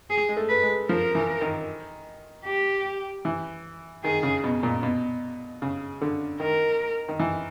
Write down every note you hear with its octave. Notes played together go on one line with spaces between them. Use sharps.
G#4
G#3
A3
B4
G#3
F3 A#4
E3
D#3
G4
E3
D#3 G#4
C#3
B2
A#2
B2
C#3
D3
D#3 A#4
D#3
E3